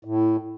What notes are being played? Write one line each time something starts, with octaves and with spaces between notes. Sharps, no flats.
A2